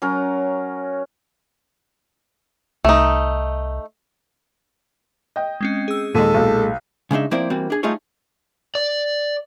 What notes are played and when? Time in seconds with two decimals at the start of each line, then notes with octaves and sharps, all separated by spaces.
0.02 F#3 C#4 A#4
2.85 C2 A3 D#4
5.36 D#5 G5
5.61 G#3 C4 C#4
5.88 G#4 E6
6.15 D#2 A#2 G#3 A4 B6 D#7
6.35 B1
7.11 C#3 G#3 D4 D#4 E5
7.31 F3 A#3 C4 E4 C5 D5
7.50 E3 G3 A#3 C4 F#4
7.70 D4 G#4
7.83 G3 A3 D#4 F4 G#4 C#5
8.75 D5